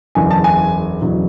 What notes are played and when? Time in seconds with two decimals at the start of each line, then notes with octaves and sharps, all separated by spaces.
0.15 F#1 E2 D3 G#5
0.31 A5
0.44 G#5
1.02 F#1 E2 D3 F#3